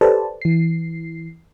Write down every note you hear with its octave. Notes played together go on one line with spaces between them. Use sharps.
G4 A4 B4 C5 D5 A5
E3 C7